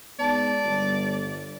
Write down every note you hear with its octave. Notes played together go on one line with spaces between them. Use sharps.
G#2 B3 D5 A5
G1